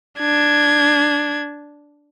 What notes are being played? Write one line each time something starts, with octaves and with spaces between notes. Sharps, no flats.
D4 G#6